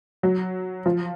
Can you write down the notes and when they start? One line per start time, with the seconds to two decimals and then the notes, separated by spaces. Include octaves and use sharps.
0.23 F#3
0.86 F3